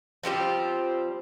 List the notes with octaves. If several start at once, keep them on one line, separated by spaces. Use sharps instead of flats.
F3 G3 C4 G4